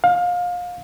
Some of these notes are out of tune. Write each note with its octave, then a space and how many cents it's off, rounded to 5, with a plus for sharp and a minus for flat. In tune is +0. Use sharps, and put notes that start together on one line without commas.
F5 +25